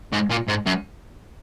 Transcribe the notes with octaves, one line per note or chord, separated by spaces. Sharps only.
G#2
A#2
G#2
F#2